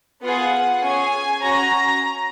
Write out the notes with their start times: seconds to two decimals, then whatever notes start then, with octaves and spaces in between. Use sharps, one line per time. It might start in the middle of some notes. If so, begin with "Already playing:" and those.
0.22 B3 F4 G#4 F#5
0.82 C#4 G#4 G#5
1.42 C#4 F#4 A#5